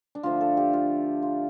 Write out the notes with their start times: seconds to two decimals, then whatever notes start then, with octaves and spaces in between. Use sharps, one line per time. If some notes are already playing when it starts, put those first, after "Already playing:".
0.15 D4
0.23 D3 F3 A3 F4
0.41 A4
0.57 G4
0.73 F4
1.23 F4